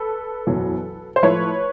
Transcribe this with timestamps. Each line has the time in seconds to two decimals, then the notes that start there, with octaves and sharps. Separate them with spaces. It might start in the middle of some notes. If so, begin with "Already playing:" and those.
Already playing: A4 B4
0.47 F#1 E2 B2 F#3
1.16 C5
1.23 A2 F3 A3 B4 C#5